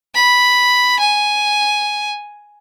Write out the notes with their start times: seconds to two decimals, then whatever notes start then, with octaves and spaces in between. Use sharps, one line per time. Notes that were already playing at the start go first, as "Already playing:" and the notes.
0.15 B5
1.00 G#5